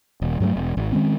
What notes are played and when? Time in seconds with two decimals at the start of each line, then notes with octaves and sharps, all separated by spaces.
0.22 D#1
0.40 G2 F#3 G3 A3
0.56 E1
0.77 G#1
0.92 D#3 G#3 C4 C#4